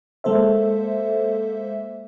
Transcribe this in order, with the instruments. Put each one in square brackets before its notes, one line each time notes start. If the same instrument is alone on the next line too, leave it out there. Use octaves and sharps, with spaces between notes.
[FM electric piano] G#3 A#3 A4 C5 E5